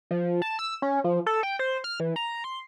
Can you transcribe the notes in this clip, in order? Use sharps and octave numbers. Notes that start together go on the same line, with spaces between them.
F3
A5
E6
C#4
F3
A4
G5
C5
F6
E3
A#5
C6